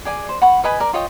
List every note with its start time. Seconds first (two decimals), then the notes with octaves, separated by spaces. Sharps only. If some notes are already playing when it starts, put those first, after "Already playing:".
0.05 G#4 D5 G#5
0.29 C5
0.42 F#5 B5 C#6
0.64 B4 D#5 G#5 B5
0.80 A#4 D5
0.93 F4 C#5 D#5 G5